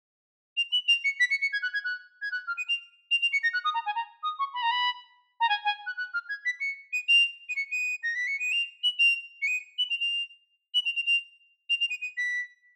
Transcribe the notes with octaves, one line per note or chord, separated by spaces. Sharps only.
F7
F#7
F7
C#7
B6
C#7
C#7
G#6
F#6
G#6
F#6
G#6
F#6
F6
D#7
F7
F7
F7
C#7
A#6
F#6
D#6
A#5
G#5
A#5
D#6
C#6
B5
A#5
B5
A#5
G#5
G#5
F#6
F#6
F6
G#6
B6
C#7
D#7
F7
D#7
C#7
D#7
A#6
B6
C#7
D#7
F7
F#7
F7
C#7
D#7
F#7
F7
F7
F#7
F7
F7
F7
F7
F7
D#7
D#7
B6